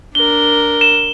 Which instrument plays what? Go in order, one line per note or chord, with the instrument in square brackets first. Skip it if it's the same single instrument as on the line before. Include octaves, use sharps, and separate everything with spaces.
[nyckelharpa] D4 A#4 [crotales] G7
[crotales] E7